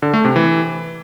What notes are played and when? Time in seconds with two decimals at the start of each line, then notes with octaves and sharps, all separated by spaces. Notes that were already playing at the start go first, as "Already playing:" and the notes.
0.02 D3
0.14 A3
0.25 C3
0.36 E3